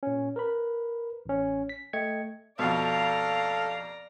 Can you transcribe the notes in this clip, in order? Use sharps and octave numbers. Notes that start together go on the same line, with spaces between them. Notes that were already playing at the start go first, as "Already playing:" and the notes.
A#2 C#4
A#4 B4 B5
A1 C#4
B6
A3 D#5 G5 G#6 C#7
F2 B2 A4 D5 F5 A#5